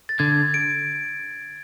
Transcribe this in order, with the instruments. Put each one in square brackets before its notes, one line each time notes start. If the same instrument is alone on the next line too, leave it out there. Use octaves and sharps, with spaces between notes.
[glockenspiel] A6
[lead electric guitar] D3 [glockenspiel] G#6
[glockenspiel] D7